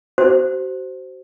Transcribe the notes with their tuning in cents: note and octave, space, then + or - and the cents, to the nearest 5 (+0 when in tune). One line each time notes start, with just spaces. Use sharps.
F#4 +35 C5 +0